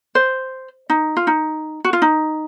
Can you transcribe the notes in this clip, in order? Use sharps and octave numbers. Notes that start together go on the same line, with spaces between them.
C5
D#4
F4
D#4
F#4
F4
D#4